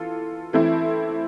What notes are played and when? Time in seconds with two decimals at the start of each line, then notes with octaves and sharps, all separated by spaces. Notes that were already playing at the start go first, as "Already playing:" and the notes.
Already playing: E3 F4 A4
0.53 E3 A3 C4 E4